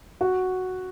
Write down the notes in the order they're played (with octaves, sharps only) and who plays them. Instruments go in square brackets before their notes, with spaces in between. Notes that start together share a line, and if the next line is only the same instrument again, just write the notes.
[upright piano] F#4